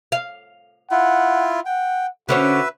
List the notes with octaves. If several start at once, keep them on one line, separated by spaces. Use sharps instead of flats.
F5
E4 F4 F#5
F#5 G5
D3 C#4 F#4 B4 C5 E5